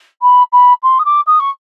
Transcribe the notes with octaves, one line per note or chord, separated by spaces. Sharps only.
B5
B5
C6
D#6
D6
D#6
C#6